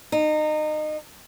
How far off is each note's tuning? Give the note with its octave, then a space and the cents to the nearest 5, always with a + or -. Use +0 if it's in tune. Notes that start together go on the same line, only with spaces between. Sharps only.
D#4 -25